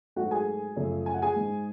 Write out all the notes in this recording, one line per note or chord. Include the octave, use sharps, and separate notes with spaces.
G#2 F#3 A3 F#4 F#5
G#4 G#5
F#2 C#3 F3 A3
G#5
F#5
G#4 G#5
G#2 G#3